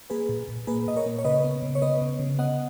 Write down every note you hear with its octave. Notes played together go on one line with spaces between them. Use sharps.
A#3 G#4 B4
A#2
A#2
A#3 G#4 B4
A#2 D#5
A#4 C#5
A#3
C#5
C#3 B4 D#5
B3
C#3
C#5
B3 B4 D#5
C#3
C#3
B3 D#5 F#5